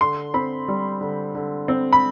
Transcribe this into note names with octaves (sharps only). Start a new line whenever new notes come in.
D3 C6
C4 B5
G3
D3
D3
C4
B5